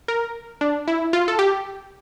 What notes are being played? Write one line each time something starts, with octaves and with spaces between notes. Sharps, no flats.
A#4
D4
E4
F4
A4
G4